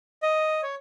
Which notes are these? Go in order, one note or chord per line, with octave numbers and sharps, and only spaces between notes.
D#5
C#5